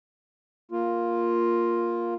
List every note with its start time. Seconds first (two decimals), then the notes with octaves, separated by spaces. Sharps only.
0.71 A#3 F4